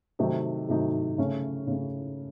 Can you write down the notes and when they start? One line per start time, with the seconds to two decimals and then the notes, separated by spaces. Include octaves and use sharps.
0.19 C3 D#3 F#3 A3 D#4
0.68 C3 D#3 F#3 A3 D#4
1.18 C#3 A3 C#4
1.67 C#3 A3 C#4